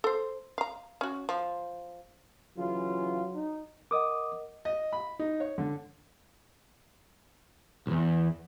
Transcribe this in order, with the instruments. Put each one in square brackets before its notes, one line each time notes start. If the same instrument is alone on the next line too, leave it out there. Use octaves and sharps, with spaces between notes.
[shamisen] A4 C5
F5 A#5
C#4 F#4
F3
[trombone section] C#3 E3 F4 [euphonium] F#3
[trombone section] D#4
[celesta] A#4 D#5 F#5 [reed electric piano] D6 D#6
[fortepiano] D#5
B5
D#4
C#5
D3
[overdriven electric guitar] B1 E2